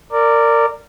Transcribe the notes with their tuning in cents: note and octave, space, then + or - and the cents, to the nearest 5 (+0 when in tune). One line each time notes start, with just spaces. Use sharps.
A#4 -20 D5 +0